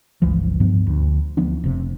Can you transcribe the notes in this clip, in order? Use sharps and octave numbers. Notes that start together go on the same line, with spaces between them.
G1 C#2 E3 F3
G2 F3 B3
D2
D2 F3 B3 D4
F1 C3